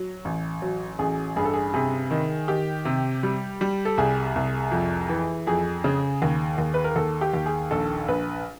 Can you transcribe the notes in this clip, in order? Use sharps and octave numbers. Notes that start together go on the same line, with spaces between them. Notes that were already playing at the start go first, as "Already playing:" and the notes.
Already playing: F#3
A1
F#3
A1 G#4
G2 G#4
A4
G#4
C3 G#4
D#3
D#3 G4
C3
G3
G3
A4
C2 G#4
C2
F2
E3
F2 G#4
C#3
D#2
D#2
B4
A#4
D#2 A4
G4
D#2
G#4
A#1 A4
A#1 B4